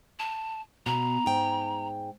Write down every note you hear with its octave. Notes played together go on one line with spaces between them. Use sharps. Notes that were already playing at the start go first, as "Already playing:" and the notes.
A5
B2 A#5
G#2 G5